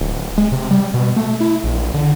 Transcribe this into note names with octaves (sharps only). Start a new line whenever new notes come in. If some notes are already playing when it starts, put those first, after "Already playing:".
D1
G#3
C3
G3
B2
A3
E4
A#1
D3